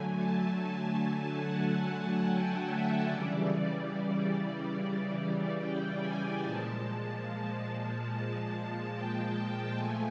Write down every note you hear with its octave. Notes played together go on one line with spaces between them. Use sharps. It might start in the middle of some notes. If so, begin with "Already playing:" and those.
Already playing: D3 F#3 A3 G#5
A5
G#5
G#5
F#5
G5
E5
C#3 E3 G3 D5
G5
G#5
A#2 F3 G#3 A5
A5
G5
G5
F3 A3 G#5